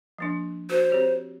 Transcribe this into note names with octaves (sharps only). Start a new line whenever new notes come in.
F3 A#3 D4
F#4 C5
C4 G4 C#5